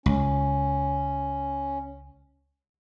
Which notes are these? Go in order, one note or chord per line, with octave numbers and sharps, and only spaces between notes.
C#2 C#4